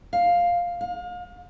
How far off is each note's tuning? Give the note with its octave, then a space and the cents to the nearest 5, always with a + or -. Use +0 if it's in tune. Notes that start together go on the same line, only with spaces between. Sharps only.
F5 +5
F5 +35